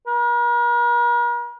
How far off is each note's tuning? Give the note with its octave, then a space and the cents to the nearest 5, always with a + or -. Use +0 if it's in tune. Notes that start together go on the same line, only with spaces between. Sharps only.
A#4 +45